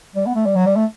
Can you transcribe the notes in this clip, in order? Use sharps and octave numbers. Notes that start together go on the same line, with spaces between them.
G3
B3
A3
G3
F#3
G3
A3